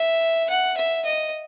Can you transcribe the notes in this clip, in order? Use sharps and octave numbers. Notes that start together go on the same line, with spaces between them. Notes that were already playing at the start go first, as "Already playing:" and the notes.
Already playing: E5
F#5
E5
D#5